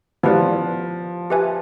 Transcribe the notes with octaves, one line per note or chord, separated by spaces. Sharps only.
F3 B3 E4 G4 B4 D5
G4 B4 E5 G#5